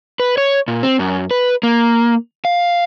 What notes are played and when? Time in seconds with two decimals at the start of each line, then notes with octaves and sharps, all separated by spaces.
0.20 B4
0.38 C#5
0.68 A#2
0.83 C4
0.99 F#2
1.31 B4
1.63 A#3
2.45 F5